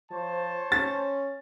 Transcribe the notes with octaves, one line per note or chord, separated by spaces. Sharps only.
F3 C5 C#5 A5
C#4 A6